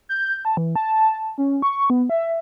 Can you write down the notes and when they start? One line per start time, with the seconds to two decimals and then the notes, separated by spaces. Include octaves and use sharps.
0.09 G6
0.45 A5
0.57 E3
0.76 A5
1.38 C#4
1.62 C#6
1.90 B3
2.10 E5